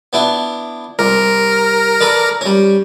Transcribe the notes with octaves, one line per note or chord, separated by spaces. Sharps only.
B3 D4 E4
C2 A#4
A4 B4 D5
G3 C#4